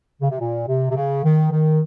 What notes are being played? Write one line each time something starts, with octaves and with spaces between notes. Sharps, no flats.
C#3
C3
A#2
C3
C3
C#3
D#3
D#3